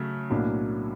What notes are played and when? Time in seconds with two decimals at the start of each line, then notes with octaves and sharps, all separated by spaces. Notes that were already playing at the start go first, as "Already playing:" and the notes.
Already playing: C#3 F#3 A3
0.30 B1 A2 F#3 A#3 D4